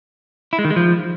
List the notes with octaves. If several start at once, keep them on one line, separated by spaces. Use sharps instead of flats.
E4
G#3
D#3
G#3
F3